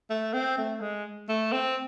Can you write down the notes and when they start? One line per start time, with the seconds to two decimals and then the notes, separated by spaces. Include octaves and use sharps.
0.10 A3
0.34 C4
0.58 A3
0.81 G#3
1.29 A3
1.52 C4